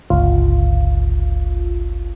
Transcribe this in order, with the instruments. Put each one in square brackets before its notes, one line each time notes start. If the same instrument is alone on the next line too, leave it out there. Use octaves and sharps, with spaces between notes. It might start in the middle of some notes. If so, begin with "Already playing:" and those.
[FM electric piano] G1 C#2 F4